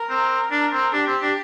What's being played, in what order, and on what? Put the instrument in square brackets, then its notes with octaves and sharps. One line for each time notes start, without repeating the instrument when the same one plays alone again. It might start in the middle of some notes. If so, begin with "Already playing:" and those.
Already playing: [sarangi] A#4
[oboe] C4
D4
C4
[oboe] D4 [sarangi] G4
[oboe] C4
D4